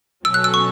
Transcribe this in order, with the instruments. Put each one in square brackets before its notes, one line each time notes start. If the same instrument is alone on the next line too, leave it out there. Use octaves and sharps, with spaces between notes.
[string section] B2 F#3 C#4 A4 [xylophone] E6
[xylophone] F#6
E6
C#6